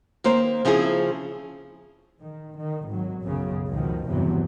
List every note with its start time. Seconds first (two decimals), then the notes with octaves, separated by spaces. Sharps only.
0.24 D#3 A#3 C5
0.65 C#3 F3 C4 E4 G#4
2.20 D#3
2.57 D#3
2.88 G#1 F#3
3.23 B1 F#2 C#3
3.68 C#2 F#2 B2 D#3 F3
4.07 E2 G2 C3 E3 F#3